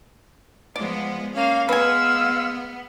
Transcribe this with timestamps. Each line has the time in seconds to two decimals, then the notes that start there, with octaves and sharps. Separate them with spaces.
0.76 F3 G#3 B3 D5
1.34 A#3 C#4 F5
1.69 G#3 B3 B4 F5 G#5 E6